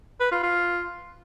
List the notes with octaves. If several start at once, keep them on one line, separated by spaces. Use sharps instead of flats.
B4
F4
F4